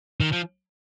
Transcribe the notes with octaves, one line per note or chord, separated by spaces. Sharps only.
D#3
F3